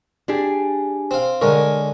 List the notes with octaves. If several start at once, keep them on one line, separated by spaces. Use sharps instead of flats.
D4 G4 G#4
C4 F5
D3 G#3 A#4 C#5